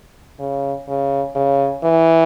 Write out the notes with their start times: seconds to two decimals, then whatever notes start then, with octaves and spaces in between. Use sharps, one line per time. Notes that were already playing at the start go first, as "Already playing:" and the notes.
0.39 C#3
0.88 C#3
1.35 C#3
1.83 E3